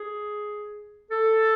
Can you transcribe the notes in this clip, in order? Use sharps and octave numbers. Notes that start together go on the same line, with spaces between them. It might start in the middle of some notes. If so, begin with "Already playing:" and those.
Already playing: G#4
A4